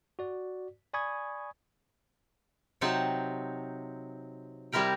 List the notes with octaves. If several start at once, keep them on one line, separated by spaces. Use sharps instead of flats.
F#4 D5
D5 G#5 B5 C#6 D#6 G#6
C3 F#3 C4 D#4 A5
C3 G3 C4 E4 A#4 G5